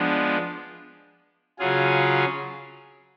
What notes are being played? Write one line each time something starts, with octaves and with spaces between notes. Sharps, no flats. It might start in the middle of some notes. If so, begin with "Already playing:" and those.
Already playing: F3 G#3 B3 D4
C#3 F#3 C#4 F4 G#4